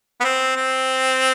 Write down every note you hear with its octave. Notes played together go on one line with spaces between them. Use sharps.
B3
C4
C4